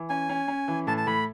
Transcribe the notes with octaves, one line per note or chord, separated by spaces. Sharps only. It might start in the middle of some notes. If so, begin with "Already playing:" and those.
Already playing: E3
C#4 G#5
C#4
C#4
E3
A2 A5
A5
A2 B5